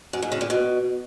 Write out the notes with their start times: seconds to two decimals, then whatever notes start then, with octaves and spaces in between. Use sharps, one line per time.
0.13 F#2
0.22 G#2
0.32 C#3
0.41 A#2
0.50 B2